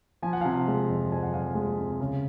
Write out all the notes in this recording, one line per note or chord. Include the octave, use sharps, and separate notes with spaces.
F3 G#5
F#5
C3 F5 G#5
G#3
F2
F2 G#5
F#5
F2 F5 G#5
G#3
C3
C#3